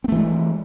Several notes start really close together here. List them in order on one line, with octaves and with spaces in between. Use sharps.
C4 A3 E3 G#3